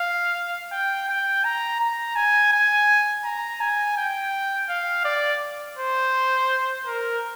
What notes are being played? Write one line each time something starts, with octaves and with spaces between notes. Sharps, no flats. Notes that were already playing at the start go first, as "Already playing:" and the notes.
Already playing: F5
G5
G5
A#5
A#5
G#5
G#5
A#5
G#5
G5
F5
D5
C5
A#4